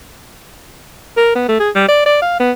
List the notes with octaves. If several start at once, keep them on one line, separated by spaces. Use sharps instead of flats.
A#4
B3
A3
G#4
G3
D5
D5
F5
B3